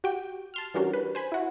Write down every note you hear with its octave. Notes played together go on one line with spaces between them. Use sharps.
F#4 G4 G5
A5 C6 F6
E3 G3 C#4 D4 F#4 A#4
B4
C5 G#5 B5
E4 F#4